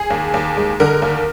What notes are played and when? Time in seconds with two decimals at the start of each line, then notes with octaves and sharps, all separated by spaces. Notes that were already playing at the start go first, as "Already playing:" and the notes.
Already playing: G#4
0.10 D#2
0.34 D#2
0.57 G#3
0.80 D3 A#4
1.02 D#2